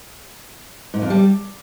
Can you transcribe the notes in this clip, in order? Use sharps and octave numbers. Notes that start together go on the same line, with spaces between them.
G#2
F2
G3